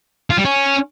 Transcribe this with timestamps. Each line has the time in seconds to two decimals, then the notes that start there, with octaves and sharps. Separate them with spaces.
0.30 F4
0.38 G3
0.45 C#4